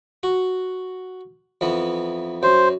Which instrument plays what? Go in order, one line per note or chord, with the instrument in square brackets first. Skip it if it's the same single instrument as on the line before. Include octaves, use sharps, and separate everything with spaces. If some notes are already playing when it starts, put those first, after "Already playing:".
[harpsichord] F#4
F2 E3 B3
[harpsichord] F#2 [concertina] C5